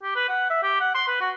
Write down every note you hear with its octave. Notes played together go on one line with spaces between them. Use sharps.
G4
B4
F#5
E5
G4
F#5
C6
B4
F#4